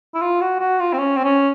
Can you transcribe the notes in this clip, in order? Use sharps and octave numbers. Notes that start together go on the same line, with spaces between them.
E4
F4
F#4
F#4
F4
C4
C#4
C4
C#4